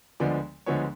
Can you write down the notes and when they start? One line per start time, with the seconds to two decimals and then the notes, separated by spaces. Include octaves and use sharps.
0.20 D2 D3 F3 G#3 B3 D5
0.66 D2 D3 F3 G#3 B3 C#5